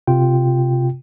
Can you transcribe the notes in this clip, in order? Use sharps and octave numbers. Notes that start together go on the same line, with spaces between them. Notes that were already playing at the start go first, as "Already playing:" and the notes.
C3 F4 G5